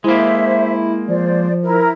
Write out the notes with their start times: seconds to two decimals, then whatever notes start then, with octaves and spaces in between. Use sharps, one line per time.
0.04 G#3 A#3 E4 C5 E5
1.08 F3 C5 D5
1.62 E4 A#4